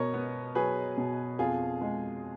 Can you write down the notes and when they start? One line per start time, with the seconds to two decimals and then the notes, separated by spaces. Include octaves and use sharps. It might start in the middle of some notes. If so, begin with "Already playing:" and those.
Already playing: B2 A#4 C#5 D#5
0.14 B3
0.55 F#3 G#4 B4
0.98 B2
1.39 F2 F4 G#4
1.81 G#3